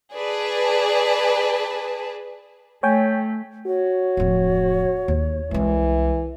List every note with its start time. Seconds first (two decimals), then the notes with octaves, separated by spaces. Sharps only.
0.14 G#4 B4 D5 A5
2.83 A3 C#5 G5 G#5
3.66 F#4 C#5
4.17 D1 F2
5.08 D#2
5.51 C2 E3 G#3